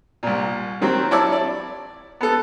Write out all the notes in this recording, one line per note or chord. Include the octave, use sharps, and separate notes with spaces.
C2 A#2
D#3 F#3 C4
E4 C#5 D5 A5 D6 E6
D5
B3 A4